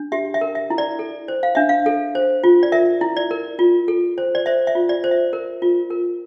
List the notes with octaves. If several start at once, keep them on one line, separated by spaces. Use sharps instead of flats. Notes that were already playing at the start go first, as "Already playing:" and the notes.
Already playing: D4
G4 E5
E5
A#4
E5
E4
D5
A4
C5
F5
D4 E5
F5
A4
C5
F4
D5
A#4 E5
E4
D5
A#4
F4
A4
C5
D5
C5 E5
E5
F4
D5
C5
E5
A#4
F4
A#4